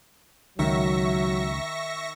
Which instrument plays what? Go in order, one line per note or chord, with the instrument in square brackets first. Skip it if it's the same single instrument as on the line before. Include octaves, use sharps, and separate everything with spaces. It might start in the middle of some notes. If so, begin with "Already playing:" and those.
[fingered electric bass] C#2 [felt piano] D#3 [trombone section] F#3 [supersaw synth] E5 C#6 A#6